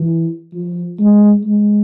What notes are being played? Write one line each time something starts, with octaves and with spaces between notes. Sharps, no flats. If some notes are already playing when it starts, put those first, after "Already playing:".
Already playing: E3
F3
G#3
G#3